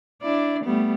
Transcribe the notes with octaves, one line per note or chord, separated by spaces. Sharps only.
D4 E4 D5
G3 A3 B3